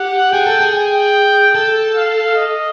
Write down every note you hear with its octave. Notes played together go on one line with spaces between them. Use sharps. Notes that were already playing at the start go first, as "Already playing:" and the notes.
Already playing: G4 F#5
G#4 G5
A4
G#4
G5
A4
F5
D#5